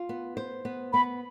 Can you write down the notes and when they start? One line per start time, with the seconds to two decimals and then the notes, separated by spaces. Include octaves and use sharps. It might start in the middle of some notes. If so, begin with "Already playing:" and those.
Already playing: F4
0.09 B3
0.37 C5
0.65 B3
0.93 B3 B5